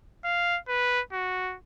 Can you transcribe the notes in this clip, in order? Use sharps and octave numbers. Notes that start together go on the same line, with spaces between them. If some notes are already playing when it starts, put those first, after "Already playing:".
F5
B4
F#4